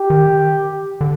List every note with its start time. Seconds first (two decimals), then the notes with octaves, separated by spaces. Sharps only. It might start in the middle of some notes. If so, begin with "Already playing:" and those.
Already playing: G4
0.10 D#3
1.01 D3